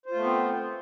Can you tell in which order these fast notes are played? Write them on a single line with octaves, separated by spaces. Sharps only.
C5 F4 A3 B3 C4